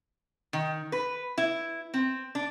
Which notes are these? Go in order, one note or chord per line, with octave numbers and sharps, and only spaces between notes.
D#3
B4
E4
C4
D4